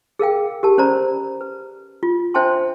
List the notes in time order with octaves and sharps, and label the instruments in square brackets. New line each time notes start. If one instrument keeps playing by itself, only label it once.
[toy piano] G#4 A#4 F5 G5
G4 A#4 A5
C#4 C5 D5 A#5 B5
B4
F4
D4 C5 E5 G5 A5 C6